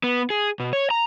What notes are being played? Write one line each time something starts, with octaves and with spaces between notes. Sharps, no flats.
B3
G#4
B2
C#5
A#5